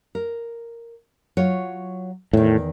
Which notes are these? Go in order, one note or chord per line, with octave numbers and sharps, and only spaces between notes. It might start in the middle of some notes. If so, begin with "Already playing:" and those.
A#4
F#3 F4 C#5
E2 A2 D#3